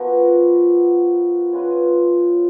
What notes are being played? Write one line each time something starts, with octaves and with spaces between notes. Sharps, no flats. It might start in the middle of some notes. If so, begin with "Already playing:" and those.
Already playing: F3 B3 F#4 A#4
C#4 F4 B4 D#5